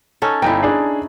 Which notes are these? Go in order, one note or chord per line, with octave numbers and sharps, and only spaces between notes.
C#4 D#4 A4
G1 D#4 E4 G5
D4 G#4